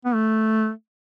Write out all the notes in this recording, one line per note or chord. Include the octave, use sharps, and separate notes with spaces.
B3
A3